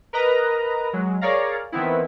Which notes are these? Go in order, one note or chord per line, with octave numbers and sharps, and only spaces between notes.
A#4 B4 D#5 A#5
F#3 G#3
G#4 A#4 C#5 D5 F5 A#5
D#3 E3 B3 C4 E4